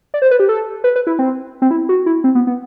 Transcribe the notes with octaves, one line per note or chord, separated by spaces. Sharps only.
D5
C5
B4
G4
A4
B4
B4
E4
C4
C4
E4
F#4
E4
C4
B3
B3